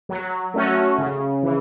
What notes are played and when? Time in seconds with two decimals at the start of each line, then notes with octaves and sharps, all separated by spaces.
0.09 F#3
0.54 A3 C#4 F#4
0.98 C#3
1.43 E3